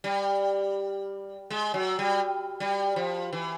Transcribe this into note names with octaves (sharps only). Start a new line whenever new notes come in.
G3
G#3
F#3
G3
G3
F3
E3